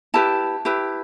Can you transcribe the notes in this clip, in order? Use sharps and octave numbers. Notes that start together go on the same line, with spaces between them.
E4 G4 B4 A5
E4 G4 B4